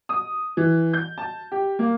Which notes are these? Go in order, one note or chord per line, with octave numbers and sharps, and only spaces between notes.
D#6
E3
G6
A5
G4
A#3